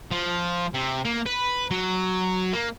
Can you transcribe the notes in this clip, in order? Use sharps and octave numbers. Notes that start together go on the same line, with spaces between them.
F3
C3
A#3
B4
F#3
A#3